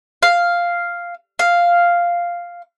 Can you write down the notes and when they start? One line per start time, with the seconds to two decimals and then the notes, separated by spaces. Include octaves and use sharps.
0.23 F5
1.39 F5